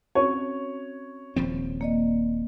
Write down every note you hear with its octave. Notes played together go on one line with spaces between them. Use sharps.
C4 C#4 F#4 C#5
D#1 F3 C4
A#3 D5 D#5